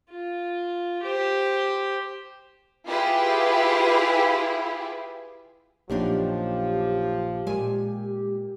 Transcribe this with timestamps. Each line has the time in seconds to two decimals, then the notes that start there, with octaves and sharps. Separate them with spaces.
0.10 F4
1.03 G4 C5
2.88 E4 F4 G4 G#4 B4
5.90 A#1 F#2 F3 A#3 D4 D#4 G4
7.47 A#2 G#3 G#5